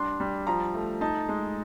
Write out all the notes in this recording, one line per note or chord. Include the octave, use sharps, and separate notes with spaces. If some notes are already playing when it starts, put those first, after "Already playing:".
Already playing: G3 D4 C6
G3
F3 A#5
A3
D#4 A5
G#3